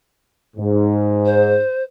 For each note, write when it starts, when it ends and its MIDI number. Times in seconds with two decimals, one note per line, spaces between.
0.57 1.58 44
1.25 1.82 72